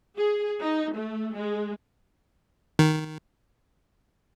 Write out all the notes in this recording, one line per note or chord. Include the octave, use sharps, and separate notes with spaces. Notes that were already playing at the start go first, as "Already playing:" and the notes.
G#4
D#4
A3
G#3
D#3